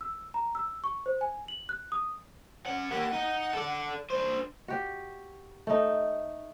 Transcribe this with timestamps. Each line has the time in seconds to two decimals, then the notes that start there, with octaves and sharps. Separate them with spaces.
0.01 E6
0.34 A#5
0.55 E6
0.84 C#6
1.06 C5
1.21 G#5
1.48 F#7
1.69 F#6
1.92 D#6
2.66 C#4 F#5
2.91 A#3 G4 F#5
3.12 D#4
3.53 A4 D5
4.10 D4 C5
4.68 F#4 G4
5.67 A3 D#4